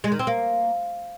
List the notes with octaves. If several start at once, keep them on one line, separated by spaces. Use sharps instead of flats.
G#3
D#3
C4
A#3